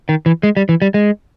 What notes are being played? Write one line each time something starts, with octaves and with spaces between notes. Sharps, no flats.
D#3
E3
G#3
G3
E3
G3
G#3